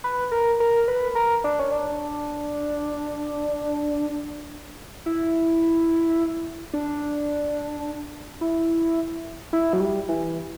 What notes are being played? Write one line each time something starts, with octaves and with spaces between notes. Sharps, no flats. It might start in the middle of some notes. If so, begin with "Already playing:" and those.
B4
A#4
A#4
B4
A#4
D4
C#4
D4
E4
D4
E4
E4
F#3
G3
E3